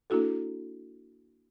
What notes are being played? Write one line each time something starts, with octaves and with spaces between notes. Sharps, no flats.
A#3 D4 E4 F#4 A4